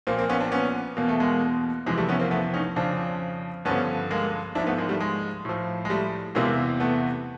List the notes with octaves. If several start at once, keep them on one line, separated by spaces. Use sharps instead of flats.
A#2 F3 A#3 C4
A#3 C4
B3 C#4
C4 D4
B3 C#4
E2 B2 A#3
A3
G#3 A#3
F2 C3 E3 G#3
G3 A3
B3 C#4
A#3 C4
A3 B3
C#4 D#4
F2 C#3 F3 C4 D4
G2 D3 F3 B3 C#4
G#3 A#3
G#2 F3 D4 E4
A3 B3
G#3 A#3
G3 A3
G#3
A2 F3
G#3
G3 A3
E2 C3 E3 G#3 A#3
A3 B3